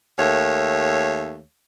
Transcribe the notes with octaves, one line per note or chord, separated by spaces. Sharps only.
D#2 A3 C#5